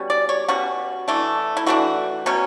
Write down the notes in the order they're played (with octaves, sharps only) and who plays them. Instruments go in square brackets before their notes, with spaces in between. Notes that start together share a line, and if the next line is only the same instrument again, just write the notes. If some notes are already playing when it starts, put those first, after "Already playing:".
Already playing: [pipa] B2 G3 C#4
D5
C#5
B2 G3 C#4 F#4
E3 A3 D4
E4
E3 A3 D4 F#4
B2 F#3 C#4